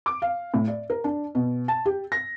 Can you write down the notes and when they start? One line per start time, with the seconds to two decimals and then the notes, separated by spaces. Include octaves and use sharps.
0.06 D6
0.22 F5
0.54 A2
0.68 D5
0.90 A#4
1.04 D4
1.35 B2
1.68 A5
1.85 G4
2.12 A#6